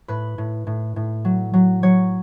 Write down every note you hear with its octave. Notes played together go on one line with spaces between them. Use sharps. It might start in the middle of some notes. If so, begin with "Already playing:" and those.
A2 B4
A2
A2
A2
F#3
F#3
F#3 C#5